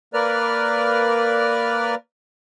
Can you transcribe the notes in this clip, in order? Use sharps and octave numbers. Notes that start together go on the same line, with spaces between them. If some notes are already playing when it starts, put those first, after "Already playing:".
A#3 A#4 B4 D5 F6